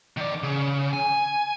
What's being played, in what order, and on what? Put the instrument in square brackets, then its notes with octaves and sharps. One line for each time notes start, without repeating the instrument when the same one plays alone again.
[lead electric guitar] D#3 D5
C#3
G#5